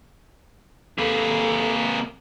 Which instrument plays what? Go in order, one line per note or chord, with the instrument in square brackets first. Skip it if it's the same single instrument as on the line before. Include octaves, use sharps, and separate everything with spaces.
[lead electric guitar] C3 A#3 [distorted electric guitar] G#4 B4 [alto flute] A4